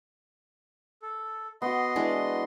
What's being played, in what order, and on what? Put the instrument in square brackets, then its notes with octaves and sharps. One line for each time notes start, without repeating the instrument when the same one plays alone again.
[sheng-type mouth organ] A4
[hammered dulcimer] B3 F#4 [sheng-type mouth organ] D#5 C6
[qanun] E3 G#3 D4